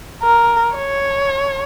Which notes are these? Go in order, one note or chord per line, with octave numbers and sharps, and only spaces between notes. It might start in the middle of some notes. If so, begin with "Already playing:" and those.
A#4
C#5